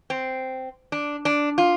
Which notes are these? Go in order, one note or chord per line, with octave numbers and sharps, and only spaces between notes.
C4
D4
D4
F4